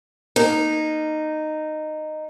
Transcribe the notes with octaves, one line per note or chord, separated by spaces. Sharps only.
A#3 D#4